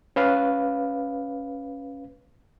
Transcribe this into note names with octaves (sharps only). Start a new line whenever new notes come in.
C#4 B4 F5